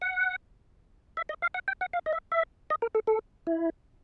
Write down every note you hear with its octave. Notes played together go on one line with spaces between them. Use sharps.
F#5
E5
D#5
F5
F#5
G5
F#5
F5
D#5
E5
E5
D#5
A#4
A4
A4
E4